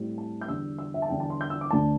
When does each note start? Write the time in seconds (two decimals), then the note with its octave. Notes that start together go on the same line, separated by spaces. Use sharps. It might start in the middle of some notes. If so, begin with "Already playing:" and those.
Already playing: A2 G3 C4
0.18 A5
0.41 G6
0.48 E2 D3 G3 D4 E6
0.79 E6
0.94 E5
1.02 A5
1.09 E2 D3 G3 G5
1.20 A5
1.30 C6
1.41 G6
1.50 E6
1.61 D6
1.71 D2 D3 A3 D4 A5